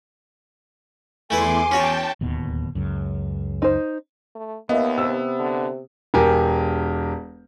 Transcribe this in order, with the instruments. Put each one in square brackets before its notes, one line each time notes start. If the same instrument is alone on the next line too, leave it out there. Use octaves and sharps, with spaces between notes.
[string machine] E2 C6 D6 [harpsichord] A3 E4 B4 [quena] G#5
[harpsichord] C#4 F#4 C#5 [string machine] G5 A5
[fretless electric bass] D1 D#2 B2
C#2 F#2
[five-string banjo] D#4 C5
[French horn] A3
[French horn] D#2 [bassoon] A#3 [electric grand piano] B3 [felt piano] D#5 E5
[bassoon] C3 [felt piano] E6
[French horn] D3
[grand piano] E1 G4 A#4 G#5